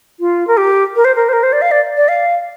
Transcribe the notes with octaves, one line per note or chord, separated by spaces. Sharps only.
F4
A#4
G4
A#4
C5
A#4
C5
A#4
C5
D5
F5
D5
D5
F5